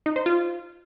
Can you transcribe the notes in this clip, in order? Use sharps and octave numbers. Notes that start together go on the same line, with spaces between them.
D#4
C5
F4